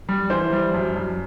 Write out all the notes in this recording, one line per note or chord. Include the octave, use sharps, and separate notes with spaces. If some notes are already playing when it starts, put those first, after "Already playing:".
G3
E3 C5
G3
F#2
F#2